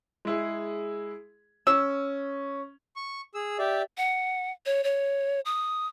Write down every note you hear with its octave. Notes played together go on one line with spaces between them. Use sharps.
G#3 E4 G#4
C#4 E6
C#6
G#4 E6
G4 D5 E5
F#5
C#5
C#5
D#6